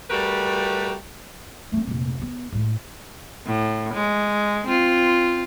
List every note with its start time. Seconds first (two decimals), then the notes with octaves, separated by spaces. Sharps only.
0.10 G3 A3 F#4 G4 A#4 B4
1.72 A3 C4
1.87 F1 A#2
2.18 D#3 B3
2.52 A2 G#3
3.46 A2
3.94 G#3
4.68 C4 F4